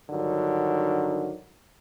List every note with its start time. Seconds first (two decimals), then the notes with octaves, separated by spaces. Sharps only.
0.10 G2 D3 D#3 F#3